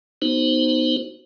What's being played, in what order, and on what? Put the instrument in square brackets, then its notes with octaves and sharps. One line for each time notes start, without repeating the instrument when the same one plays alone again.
[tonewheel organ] B3 D#4 F#4 C5